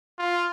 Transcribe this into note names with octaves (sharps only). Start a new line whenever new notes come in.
F4